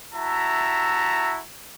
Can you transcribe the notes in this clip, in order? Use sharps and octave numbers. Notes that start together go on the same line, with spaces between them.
E4 F#4 E5 A5 A#5